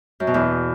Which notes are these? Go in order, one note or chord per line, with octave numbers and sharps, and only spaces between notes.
F#2
B2
E2